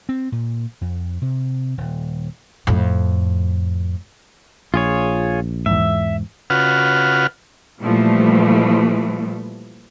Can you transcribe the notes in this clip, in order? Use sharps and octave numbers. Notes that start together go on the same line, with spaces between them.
C4
A#2
F2
C3
D#1
F2 A2
A#1 F4 G#4 C#5
E2 G#2 E5
C#3 F4 F#4 B4 F#5 F6
A#2 E3 F3 G3 A3